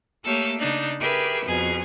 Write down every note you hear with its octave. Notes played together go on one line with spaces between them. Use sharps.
A3 A#3 G4 A4 C#5
C#3 D4 D#4 D5
G4 G#4 A#4 B4 E5
F2 B2 G#4 G#5